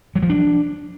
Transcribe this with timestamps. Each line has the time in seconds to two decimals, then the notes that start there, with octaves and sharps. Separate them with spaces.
0.16 F#3
0.22 F3
0.29 D4